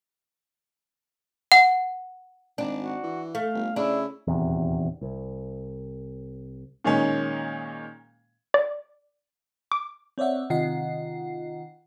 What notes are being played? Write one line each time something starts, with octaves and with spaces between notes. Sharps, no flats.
F#5
G#1 D4
F#4
E3
A3 F5
G1
C#3 D4 E4
D#1 E2 C3
C2
A#2 D#3 G#3 C#4
D5
D6
C4 C#5 D5 E5 F#5
C3 D#3 F4 D#5 F#5 C7